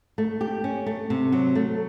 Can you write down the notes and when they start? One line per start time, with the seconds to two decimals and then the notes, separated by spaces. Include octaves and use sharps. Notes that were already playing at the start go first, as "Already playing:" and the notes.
0.18 A3
0.41 G4
0.64 C#4
0.86 A3
1.10 C3
1.32 F#3
1.55 A3